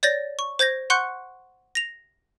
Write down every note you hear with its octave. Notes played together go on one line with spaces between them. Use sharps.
C#5 D5 G6 A6 A#6
C#6
C5 G6 G#6 A#6
F#5 C6 C#6 F#6 G6 C#7
A#6 F7